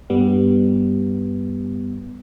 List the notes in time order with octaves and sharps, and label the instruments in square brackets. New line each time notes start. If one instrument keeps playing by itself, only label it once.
[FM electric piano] G2 G3 B3